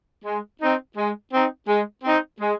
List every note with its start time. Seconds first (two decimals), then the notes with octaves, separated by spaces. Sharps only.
0.25 G#3
0.61 C4 D#4
0.97 G#3
1.32 C4 D#4
1.68 G#3
2.03 C4 D#4
2.40 G#3